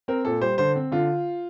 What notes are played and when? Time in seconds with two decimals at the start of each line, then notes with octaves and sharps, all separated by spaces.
0.08 C4 A#4
0.25 A#2 A4
0.41 G3 C5
0.58 D3 C5
0.76 C4
0.92 D3 F4